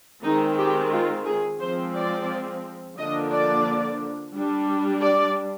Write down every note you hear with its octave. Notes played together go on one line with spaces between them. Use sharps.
D#3 G#3 C4 D#4
G4
F4
G#4
F3 G#3 C4 C5
D5
D3 F3 A#3 D4 D#5
D5
G3 D4
D5